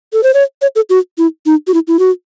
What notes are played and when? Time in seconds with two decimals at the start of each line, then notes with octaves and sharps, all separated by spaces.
0.13 A4
0.23 C5
0.34 C#5
0.62 C#5
0.76 A4
0.90 F#4
1.18 E4
1.46 D#4
1.67 F#4
1.74 E4
1.88 E4
1.99 F#4